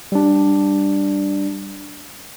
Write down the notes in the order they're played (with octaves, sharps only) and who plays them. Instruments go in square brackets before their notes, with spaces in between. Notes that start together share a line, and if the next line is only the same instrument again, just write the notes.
[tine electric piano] G3 D4